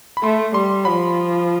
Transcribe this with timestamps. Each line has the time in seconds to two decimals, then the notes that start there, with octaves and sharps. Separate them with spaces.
0.17 B5
0.23 A3 C6
0.54 G3 C6
0.85 F3 B5